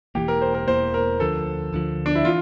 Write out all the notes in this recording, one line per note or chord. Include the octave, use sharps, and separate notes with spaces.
E1 E2 E3 A#3 G4
A#4
C5
A#4
E1 E2 E3 A#3 C5
A#4
D2 D3 F3 A4
D2 D3 F3
D4
E4
E3 F4